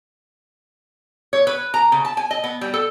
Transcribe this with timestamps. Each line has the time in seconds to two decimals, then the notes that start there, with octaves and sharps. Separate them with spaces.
1.33 C#5
1.47 B4
1.74 A#5
1.92 C#3
2.05 A5
2.17 G#5
2.31 D#5
2.44 B3
2.61 G3
2.74 A4